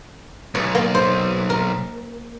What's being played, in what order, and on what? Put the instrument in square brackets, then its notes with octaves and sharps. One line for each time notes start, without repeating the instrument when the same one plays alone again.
[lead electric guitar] B1 [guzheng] C#5
[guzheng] A#3
C5
A#4